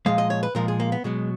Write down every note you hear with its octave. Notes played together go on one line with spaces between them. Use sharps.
A#2 F3 G#3 F5
D#5
C#5
B4
A#2 F3 G#3 A#4
G#4
A#3
B3
B2 F#3 G#3